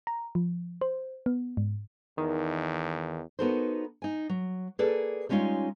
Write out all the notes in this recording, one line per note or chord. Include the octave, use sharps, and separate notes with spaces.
A#5
F3
C5
B3
G#2
E2 D#3
B3 D#4 F#4 A4 A#4 C5
D#4 G#5
F#3
A#3 G#4 A4 B4 D5
G3 G#3 C#4 D#4 F4 C#5